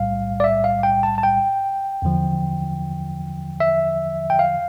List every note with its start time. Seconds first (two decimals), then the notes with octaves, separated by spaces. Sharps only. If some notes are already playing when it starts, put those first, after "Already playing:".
Already playing: B1 A2 G3 F5
0.40 D5
0.44 E5
0.64 F5
0.83 G5
1.03 A5
1.18 A5
1.23 G5
2.02 E2 D3 F3
3.60 E5
4.30 G5
4.39 F5